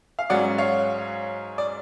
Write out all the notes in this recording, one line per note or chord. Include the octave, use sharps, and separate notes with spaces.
F5
G#2 F#3 C#4 D5 F#5
C#5 F5
D5